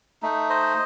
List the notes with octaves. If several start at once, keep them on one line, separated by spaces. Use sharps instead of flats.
A3 D#4
C5 D#5